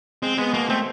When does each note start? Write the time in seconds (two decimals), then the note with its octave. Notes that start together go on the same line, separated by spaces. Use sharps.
0.22 G#3 C4
0.38 G#3 B3
0.53 B2 A#3
0.69 A3 C4